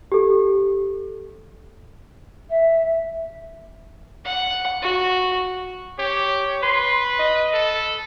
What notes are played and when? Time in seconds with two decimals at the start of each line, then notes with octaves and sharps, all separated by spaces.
0.12 G4 A4
2.49 E5
4.25 F#5
4.82 F#4
5.99 G4 C#5
6.63 B4 C6
7.19 D#5
7.54 A4